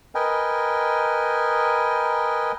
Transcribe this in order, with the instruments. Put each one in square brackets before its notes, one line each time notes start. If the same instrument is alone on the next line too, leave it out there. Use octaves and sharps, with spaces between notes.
[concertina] A#4 B4 D#5 G5 G#5